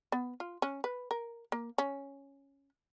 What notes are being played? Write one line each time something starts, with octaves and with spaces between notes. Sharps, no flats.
B3
F4
C#4
B4
A#4
A#3
C#4